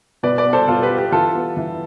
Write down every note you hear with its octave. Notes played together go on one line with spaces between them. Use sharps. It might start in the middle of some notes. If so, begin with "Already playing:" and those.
B2 B4 D5
B4 D5
B3
A4 C5
B2 F4 A4
G4 B4
B3
G4 B4
E3 F4 A4
B3
E3